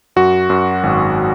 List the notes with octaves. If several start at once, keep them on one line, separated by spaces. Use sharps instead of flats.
F#2 F#4
F#2
G#1